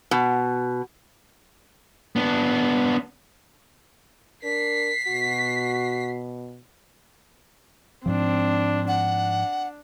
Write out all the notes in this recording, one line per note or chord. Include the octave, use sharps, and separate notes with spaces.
B2
B3 D4
D4 A#4 B6 C7
B2 F#4
G#2 F3 C4 D4
D4 F#5